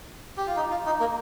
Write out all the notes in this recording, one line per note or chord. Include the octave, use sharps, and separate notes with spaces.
G4
F4
D#4
F4
D#4
A#3